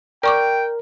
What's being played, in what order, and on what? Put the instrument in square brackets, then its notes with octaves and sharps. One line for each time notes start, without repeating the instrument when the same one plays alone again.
[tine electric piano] A#4 [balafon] D5 C#6 D6 [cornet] G5